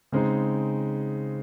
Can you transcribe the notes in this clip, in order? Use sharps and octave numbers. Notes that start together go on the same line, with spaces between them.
C#3 G#3 C4 D#4